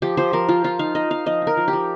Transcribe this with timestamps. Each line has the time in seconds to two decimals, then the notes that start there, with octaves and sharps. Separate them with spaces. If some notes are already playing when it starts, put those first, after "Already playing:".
0.02 F3 G4
0.17 F3 C5
0.33 F3 A#4
0.49 F3 F4
0.64 F3 F4
0.79 D#4 F5
0.95 D#4 D#5
1.10 D#4 F5
1.26 F3 D#5
1.42 D#4
1.47 A#4
1.57 F3
1.68 G4
1.73 F3